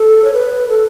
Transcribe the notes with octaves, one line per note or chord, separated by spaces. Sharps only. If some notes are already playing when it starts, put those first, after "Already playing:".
Already playing: A4
C#5
B4
A4